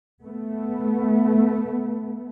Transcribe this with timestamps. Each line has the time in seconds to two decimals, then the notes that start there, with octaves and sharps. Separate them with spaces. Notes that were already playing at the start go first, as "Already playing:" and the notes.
0.23 A3 B3